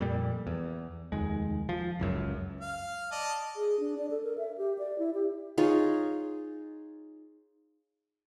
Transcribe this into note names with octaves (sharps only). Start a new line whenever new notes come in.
F2 A#2 G3
E2
F1 D#2 G#3
F3
F#1 C#2 F#2
F5
D5 D#5 A5
G#4
D4
D5
A4
A#4
E5
G4
D5
E4
G4
D#4 F4 G#4 C#5